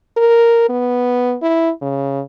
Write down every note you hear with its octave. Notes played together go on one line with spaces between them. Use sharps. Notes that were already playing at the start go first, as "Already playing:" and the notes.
A#4
B3
E4
C#3